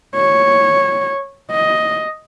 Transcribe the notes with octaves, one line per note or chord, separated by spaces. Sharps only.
C#5
D#5